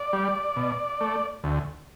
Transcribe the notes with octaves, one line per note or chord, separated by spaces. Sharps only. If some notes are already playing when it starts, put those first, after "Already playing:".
Already playing: D5
G3
B2
A3
D2